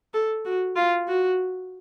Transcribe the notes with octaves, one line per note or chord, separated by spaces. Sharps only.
A4
F#4
F4
F#4